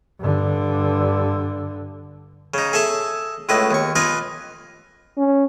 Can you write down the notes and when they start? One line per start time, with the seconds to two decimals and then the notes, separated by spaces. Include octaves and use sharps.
0.20 G2 D3
2.54 C#3 D#4
2.73 G#4 A4 E5 A5
3.49 C#2 A2 B4 D#5
3.71 D#2 C#6
3.95 F4 B4 D5 D#5 G#5
5.18 C#4